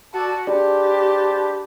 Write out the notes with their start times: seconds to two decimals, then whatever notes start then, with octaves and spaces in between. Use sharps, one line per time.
0.14 F#4 A4 D5 A5
0.47 D4 G4 G#4 B4 C5 D5 A5